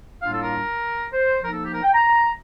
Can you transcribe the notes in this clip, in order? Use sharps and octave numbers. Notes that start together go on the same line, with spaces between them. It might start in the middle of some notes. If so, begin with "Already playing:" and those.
A2 G3 A#3 D4 F4 F5
A4
A#4
C5
F3 A#3 D#4 A#4
A4
G4
A#4
G5
A#5